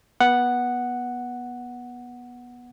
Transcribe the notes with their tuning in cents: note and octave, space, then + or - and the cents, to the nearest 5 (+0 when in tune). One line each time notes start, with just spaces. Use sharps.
B3 -20 F#5 +0